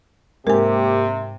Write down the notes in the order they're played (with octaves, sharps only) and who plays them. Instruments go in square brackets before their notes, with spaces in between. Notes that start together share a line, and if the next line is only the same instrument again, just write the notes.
[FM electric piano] G#2 [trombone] C3 [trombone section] A#3 C4 G4 [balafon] A#4 G#5